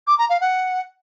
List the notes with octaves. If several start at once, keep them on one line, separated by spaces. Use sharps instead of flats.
D6
A#5
F5
F#5